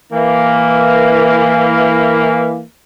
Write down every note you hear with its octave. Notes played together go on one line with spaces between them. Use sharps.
E3 A#3